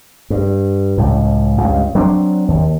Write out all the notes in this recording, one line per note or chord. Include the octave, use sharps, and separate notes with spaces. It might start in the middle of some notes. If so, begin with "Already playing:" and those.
G2
C#2 A2
C#2 G2
F#3 C4 D4
D#2